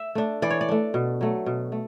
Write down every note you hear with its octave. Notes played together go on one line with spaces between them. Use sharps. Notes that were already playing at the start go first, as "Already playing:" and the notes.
Already playing: E5
A3 D4
E3 D5
C#5
D5
A3 D4
B2
F#3 A3
B2
A3